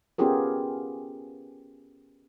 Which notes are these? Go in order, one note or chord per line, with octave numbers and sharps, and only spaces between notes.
B3 C#4 F4 G4 G#4 A#4